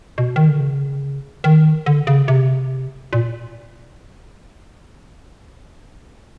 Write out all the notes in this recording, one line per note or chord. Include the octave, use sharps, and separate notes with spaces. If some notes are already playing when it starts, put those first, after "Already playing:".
B2
D#3
D3
C#3
D#3
D3
C#3
C3
A#2